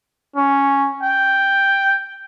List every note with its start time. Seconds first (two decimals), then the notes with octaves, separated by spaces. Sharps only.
0.36 C#4
1.03 G5